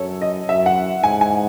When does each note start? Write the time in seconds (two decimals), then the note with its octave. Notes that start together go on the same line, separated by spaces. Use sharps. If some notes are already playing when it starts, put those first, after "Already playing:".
Already playing: F#2 A4 C#5
0.22 D#5
0.48 F#2 E5
0.66 F#5
1.03 G#2 G#5
1.21 G#5